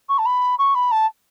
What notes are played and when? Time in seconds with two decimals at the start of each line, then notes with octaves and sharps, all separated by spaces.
0.09 C#6
0.18 A5
0.25 B5
0.59 C#6
0.75 B5
0.91 A5